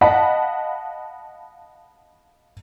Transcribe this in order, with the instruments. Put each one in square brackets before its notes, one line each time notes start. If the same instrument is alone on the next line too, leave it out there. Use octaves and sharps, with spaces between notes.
[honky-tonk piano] D#5 F5 F#5 A5 B5 B6